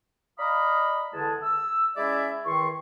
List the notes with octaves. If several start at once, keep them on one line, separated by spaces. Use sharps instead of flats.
D5 D#5 F5 A#5 B5 D#6
E2 D3 G#3 A5
E6
G#3 C#4 E4 D5 E5
E2 D#3 C6 C#6